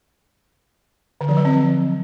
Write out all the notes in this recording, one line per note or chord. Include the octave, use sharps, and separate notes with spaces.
D3
F3
F#3
C4